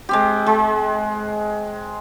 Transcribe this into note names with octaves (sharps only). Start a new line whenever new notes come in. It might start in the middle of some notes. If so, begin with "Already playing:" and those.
G#3 C4 G4
G#3